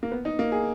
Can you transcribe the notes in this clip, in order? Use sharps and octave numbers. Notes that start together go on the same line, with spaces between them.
A#3
B3
D#4
A#3
G#4